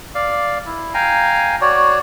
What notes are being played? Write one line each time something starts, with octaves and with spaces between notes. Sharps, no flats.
D5 F5
E4
F5 G5 G#5 A#5
F#4 C#5 D5